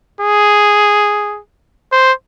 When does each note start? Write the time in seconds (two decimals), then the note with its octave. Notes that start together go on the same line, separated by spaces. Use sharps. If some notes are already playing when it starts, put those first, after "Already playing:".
0.21 G#4
1.92 C5